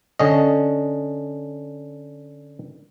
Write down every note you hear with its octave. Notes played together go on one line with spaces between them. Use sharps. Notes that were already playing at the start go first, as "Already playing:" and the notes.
D3 C#4 D#5